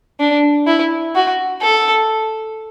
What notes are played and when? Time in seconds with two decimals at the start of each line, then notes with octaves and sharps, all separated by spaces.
0.20 D4
0.67 E4
1.15 F#4
1.62 A4